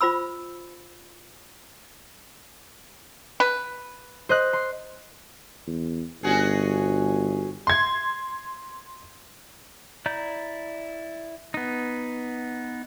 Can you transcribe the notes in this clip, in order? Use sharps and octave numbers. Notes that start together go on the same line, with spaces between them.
F4 C5 B5 E6
B4
C5 D#5 F#6
C6
E2
G1 C#4 F#4 G#4
C6 G#6
E4 D5 A#5 G6
B3 D#4